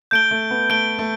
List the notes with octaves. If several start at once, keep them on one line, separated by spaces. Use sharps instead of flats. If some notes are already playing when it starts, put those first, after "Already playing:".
A3 G6 D7 G7
A3
B3
A3 G6 D7 G7
A3